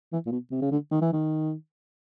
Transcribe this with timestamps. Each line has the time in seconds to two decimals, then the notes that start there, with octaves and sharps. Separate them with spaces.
0.12 E3
0.26 A#2
0.32 B2
0.51 C3
0.62 C#3
0.71 D3
0.91 D#3
1.02 E3
1.12 D#3